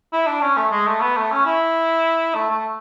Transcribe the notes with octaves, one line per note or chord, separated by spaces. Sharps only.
E4
D4
C#4
A3
G#3
A3
B3
A3
C#4
E4
A3
A3